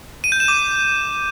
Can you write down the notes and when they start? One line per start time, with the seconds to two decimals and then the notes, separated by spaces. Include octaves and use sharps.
0.24 D#7
0.32 G6
0.40 E7
0.48 D6